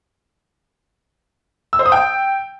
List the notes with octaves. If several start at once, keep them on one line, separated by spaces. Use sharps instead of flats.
E6
C5
D#6
G5